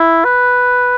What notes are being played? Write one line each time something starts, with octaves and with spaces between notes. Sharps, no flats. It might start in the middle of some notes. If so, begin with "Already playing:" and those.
Already playing: E4
B4